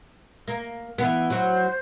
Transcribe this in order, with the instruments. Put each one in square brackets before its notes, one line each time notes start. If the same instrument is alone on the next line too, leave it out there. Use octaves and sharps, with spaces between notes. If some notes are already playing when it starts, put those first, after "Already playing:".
[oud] A#3
E3 B3
[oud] F#3 F#4 [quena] C5